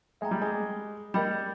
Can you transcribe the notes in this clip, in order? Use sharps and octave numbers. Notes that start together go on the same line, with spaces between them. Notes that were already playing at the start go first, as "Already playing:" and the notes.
G#3 E5 G5 A#5
G3
G#3
G3 A#4 D#5 G5 B5